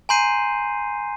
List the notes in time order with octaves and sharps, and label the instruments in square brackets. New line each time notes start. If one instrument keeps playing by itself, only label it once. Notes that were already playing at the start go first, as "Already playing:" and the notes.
[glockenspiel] G#5 A#5 C6 G6 C7 D#7